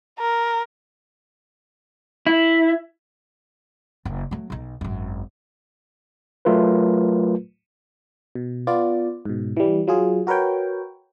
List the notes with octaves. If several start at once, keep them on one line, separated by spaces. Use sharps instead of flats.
A#4
E4
F#1
F#3 A3
B1 D#4
G#1 F#2
F#3 A3 F4 A#4 B4
B2
B3 F4 D5
G#2 B2
E3 G3
F#3 F4 G#4
F#4 A#4 B4 C#5 G5